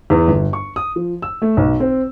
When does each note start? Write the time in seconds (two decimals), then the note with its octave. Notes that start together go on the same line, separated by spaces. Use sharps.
0.10 E2
0.28 G1
0.53 C#6
0.76 D#6
0.96 F3
1.22 E6
1.42 A3
1.57 B1
1.80 C4